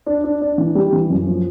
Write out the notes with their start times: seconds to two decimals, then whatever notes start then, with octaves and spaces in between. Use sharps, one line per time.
0.06 D4
0.24 D4
0.41 D4
0.58 E3
0.75 G3
0.93 E3
1.10 F#2
1.27 F3